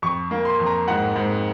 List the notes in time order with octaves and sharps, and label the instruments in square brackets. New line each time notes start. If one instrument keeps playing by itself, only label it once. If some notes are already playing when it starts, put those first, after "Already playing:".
[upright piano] F2 C#6
A#3
C6
F2
A#5
G#2 F#5
G#2